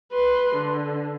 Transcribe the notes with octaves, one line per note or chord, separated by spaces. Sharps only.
B4 C6
D3